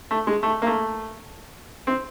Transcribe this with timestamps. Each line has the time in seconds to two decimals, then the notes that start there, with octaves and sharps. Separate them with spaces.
0.11 A3
0.27 G#3
0.43 A3
0.62 A#3
0.67 A3
1.87 C4